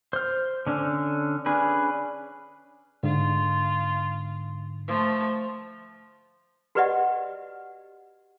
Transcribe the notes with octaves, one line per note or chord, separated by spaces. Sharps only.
C5 F6
D3 C#4 D4
C#4 D4 G#4 B4
G#2 D3 F4
F3 A3
F#4 G4 B4 D5 D#5 F#5